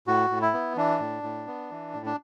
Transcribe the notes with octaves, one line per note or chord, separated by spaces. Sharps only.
A2 F#4
A2
E4
B3
E3 D4
A2
A2
B3
E3
A2
D4